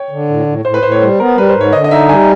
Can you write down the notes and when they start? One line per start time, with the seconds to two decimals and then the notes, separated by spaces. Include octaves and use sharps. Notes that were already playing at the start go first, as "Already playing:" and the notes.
Already playing: C#5 G5
0.10 D3
0.29 A2
0.47 A2
0.65 A2 C5
0.74 B4
0.83 A2 C5
0.92 C#5
1.02 G3 C5
1.19 B3 A#4
1.37 G3 B4
1.49 C5
1.55 G#2
1.61 C#5
1.73 D3 D#5
1.84 D#5
1.91 D#4 E5
2.09 G3 G#5